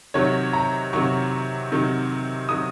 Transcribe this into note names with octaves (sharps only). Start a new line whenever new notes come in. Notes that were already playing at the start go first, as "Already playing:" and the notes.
C3 D#3 F#3 C#5
A#5
C3 D#3 F#3 C#6
C3 D#3 F#3
C3 D#3 F#3 D#6